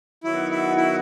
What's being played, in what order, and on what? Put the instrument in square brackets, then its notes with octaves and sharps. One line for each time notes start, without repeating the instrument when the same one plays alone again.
[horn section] F#2 D#3 F#3 B3 F#4 [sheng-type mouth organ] E4
[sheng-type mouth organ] E4
E4